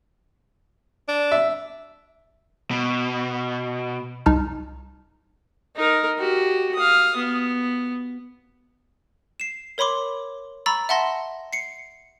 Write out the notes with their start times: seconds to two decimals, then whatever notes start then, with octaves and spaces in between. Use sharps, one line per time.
1.08 D4
1.32 E5
2.71 B2
4.26 C2 D#4 A5 F6
5.76 D#4 A#4
6.19 F#4 G4
6.75 F5 D#6
7.17 B3
9.40 C7 E7
9.78 A#4 C#5 B5 C6 D6
10.66 A#5 B5 C#6 E6 A6
10.89 E5 F#5 A5 C6 A#6
11.53 C7 C#7